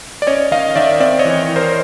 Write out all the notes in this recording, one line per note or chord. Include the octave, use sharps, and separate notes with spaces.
D5
C#4 C#5 D#5
D#3 D#5 F5
D#3 D5 E5
C4 D5 E5
C#5 D#5
E3
E3
A#4 C5